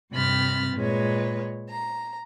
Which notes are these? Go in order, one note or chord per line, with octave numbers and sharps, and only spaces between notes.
G2 C3 C4 B5 F6 A6
A#2 G#3 B4 C#5
A#5